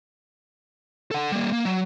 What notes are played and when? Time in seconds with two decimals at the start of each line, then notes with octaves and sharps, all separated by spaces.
1.11 A4 F#5
1.32 G3 A#3
1.53 A#3
1.65 F#3